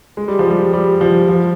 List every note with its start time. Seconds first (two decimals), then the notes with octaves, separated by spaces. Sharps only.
0.17 G#3
0.28 G3
0.39 F3
0.50 G3
0.73 G3
1.01 F3
1.28 F3